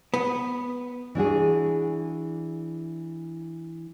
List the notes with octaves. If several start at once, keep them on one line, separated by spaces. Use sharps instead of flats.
B3
E3 D4 F#4 G#4